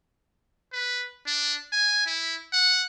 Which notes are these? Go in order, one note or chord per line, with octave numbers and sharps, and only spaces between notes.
B4
D4
G#5
E4
F#5